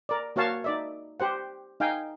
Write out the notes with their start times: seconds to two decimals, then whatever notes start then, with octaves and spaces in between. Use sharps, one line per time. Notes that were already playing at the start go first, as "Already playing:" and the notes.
0.09 A#4 D5
0.36 A#3 F#4 C#5 F5 A5
0.64 D#4 D5 E5
1.20 G4 C5 F#5
1.80 D#4 F5 G5 G#5